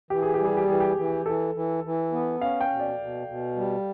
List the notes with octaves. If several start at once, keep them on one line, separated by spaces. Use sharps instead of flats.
E3 G4
G#4
G4
G3
G#4
G4
E3 G#4
G4
E3
E3 A4
E3
E3
B3
C#4 F5
G5
B2
D5
B2
B2
G3